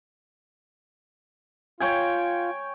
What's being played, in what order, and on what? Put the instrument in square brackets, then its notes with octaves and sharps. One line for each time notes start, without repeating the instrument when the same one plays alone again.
[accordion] F4 [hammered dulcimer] C#5 G5 G#5